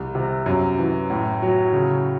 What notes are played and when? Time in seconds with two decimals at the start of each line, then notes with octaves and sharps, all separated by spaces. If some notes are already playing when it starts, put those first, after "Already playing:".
Already playing: C2
0.15 C3
0.46 F#2
0.79 E3
1.10 A2
1.42 F#3
1.73 C#3